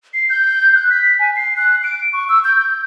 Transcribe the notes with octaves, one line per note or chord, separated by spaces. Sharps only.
C7
G6
F#6
B6
G#5
C7
F#6
D7
C#6
E6
G6
G6